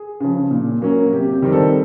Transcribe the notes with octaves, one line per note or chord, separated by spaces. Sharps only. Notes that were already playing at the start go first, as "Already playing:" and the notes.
Already playing: G#4
C#3 F3
A#2
F#3 A#3 C#4
C3 G4
G4
D#3 G3 C4
A4